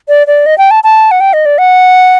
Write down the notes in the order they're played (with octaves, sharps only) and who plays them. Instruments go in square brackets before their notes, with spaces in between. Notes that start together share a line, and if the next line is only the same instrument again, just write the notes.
[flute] D5
D5
D#5
G5
A5
A5
F#5
G5
D#5
D5
F#5